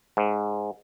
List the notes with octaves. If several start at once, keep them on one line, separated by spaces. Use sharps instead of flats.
G#2